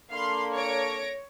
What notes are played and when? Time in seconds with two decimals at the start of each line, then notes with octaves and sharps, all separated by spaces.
0.11 A#3 D4 A4 F5 B5 C6
0.56 C#5 A#6 D7